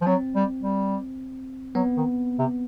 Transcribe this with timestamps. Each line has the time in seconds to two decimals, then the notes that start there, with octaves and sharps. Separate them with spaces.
0.01 F3
0.06 F#3 C4
0.35 G3
0.62 G3
1.75 F#3 B3
1.97 D#3
2.39 C3